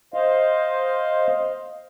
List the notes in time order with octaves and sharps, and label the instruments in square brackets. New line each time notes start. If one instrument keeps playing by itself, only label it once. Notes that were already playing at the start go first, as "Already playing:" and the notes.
[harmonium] C5 D#5 F5